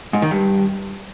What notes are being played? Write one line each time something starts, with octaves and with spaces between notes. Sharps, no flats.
G#2
D#3
G2